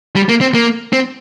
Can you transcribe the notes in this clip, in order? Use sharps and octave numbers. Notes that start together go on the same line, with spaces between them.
G3
A#3
C4
A#3
C4